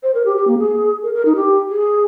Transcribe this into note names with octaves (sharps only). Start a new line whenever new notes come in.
C5
A#4
G4
G4
A#3
G#4
A#4
A#4
D#4
G4
G#4